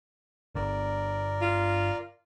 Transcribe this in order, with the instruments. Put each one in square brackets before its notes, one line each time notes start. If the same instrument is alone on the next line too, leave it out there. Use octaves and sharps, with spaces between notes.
[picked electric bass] G1 D3 [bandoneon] A#4 D5
[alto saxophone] F4